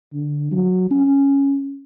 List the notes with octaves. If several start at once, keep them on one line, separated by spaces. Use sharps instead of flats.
D3
F#3
C#4